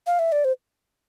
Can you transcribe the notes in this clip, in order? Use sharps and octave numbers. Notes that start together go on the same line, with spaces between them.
F5
E5
D5
C5